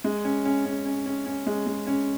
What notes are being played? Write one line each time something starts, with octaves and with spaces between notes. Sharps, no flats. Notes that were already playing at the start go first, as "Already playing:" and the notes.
G#3
C#4
C#4
C#4
C#4
C#4
C#4
G#3
G#3
C#4